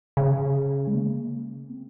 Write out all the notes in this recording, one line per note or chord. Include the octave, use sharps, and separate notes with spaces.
C#3
G#3
A#3
C4